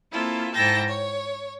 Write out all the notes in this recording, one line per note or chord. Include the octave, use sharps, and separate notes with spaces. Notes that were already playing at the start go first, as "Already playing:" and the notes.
A#3 C4 E4 F4 A4
G#2 E4 A4 G5 A5 A#6
C#5